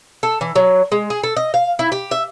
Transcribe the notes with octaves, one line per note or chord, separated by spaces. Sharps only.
A4
E3
F#3
G#3
G#4
A4
D#5
F5
E4
G4
E5